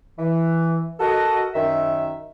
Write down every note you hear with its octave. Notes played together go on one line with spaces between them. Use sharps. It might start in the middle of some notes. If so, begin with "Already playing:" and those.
E3
F#4 A4 A#4 D#5
F#2 D#3 E5